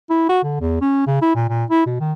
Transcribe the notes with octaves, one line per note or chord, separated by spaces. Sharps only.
E4
F#4
D3
E2
C#4
C#3
E4
A#2
A#2
E4
B2
D#3